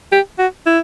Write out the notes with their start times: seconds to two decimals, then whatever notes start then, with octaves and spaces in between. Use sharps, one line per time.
0.12 G4
0.38 F#4
0.66 E4